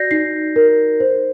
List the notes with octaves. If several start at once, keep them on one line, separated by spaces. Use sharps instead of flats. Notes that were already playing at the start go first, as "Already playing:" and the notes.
Already playing: F#4 D5 G6 A#6 C7
D#4 C7
A#4
C5